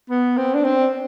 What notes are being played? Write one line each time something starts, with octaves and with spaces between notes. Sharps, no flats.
B3
C4
D4
C4